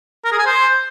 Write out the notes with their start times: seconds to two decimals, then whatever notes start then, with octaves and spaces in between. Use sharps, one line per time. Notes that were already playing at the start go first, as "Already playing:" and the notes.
0.25 A#4
0.32 G#4
0.39 G#5
0.46 C5